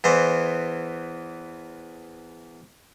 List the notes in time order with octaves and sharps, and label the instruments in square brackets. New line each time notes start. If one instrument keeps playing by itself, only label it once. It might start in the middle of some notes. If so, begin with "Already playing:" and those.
[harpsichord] E2 E3 C5